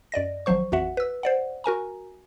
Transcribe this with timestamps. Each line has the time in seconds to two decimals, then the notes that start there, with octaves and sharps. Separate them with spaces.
0.12 F#2 D5 D#5 A#6
0.46 G#1 F3 F#3 C5 C#6
0.72 A1 F2 F#4 E5 F#5
0.97 B4 E6
1.23 C5 D5 F#5
1.64 F#4 A#4 G#5 A#5